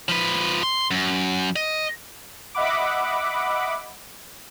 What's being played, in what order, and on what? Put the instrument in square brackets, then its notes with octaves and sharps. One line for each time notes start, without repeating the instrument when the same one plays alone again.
[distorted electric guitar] F3 B4
C6
F#2
D#5
[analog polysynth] D#5 E5 F#5 B5 D6